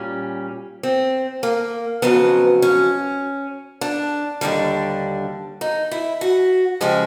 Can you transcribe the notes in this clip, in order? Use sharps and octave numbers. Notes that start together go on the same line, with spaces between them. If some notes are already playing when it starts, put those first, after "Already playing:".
Already playing: A#2 G3 C#4
C4
A#3
F2 C#3 F#3 B3
C#4
D4
D#2 D3 G3 D4
D#4
E4
F#4
C#3 F3 G#3 G4